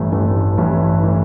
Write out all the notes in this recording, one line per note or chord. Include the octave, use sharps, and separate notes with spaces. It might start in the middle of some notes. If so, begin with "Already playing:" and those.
Already playing: A1 G2 E3 A3
A1 G2 E3 A3
A1 G2 E3 A3
E3 A3